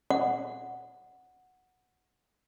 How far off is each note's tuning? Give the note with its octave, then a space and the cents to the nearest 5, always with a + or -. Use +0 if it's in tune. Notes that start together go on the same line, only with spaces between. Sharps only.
F#5 -5